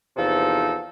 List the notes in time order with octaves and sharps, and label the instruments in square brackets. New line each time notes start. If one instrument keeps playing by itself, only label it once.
[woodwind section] E2 C3 F3 D#4 A4